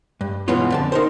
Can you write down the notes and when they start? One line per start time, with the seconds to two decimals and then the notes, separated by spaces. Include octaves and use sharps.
0.21 G2
0.48 B2 E3 G#3 B3 C#4 F4
0.70 F2 D3 A5
0.92 D#4 A#4 C5